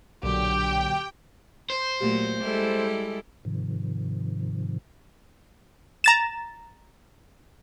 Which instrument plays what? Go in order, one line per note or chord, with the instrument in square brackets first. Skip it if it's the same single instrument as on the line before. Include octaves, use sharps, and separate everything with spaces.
[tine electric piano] B1 [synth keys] A#2 D3 F#3 [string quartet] G4 [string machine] G5
[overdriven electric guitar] C5
[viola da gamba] A#2 F#3 [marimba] A3 A#3 G4
[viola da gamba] G3 E4 [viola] G#3 A4
[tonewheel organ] G#2 C3 D#3 F3
[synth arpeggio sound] A#5 A6 E7